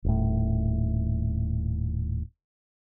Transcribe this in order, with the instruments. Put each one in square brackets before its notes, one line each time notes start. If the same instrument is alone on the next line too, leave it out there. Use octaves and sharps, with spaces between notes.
[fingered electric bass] D#1 A2